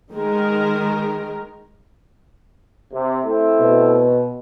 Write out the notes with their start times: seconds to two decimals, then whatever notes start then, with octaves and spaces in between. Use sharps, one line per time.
0.13 D#3 G#3 A#4
2.93 C3
3.25 A3 C4 E4
3.60 B2